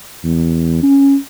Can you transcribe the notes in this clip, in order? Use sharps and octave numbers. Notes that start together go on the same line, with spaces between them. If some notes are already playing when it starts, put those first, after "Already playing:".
E2
C#4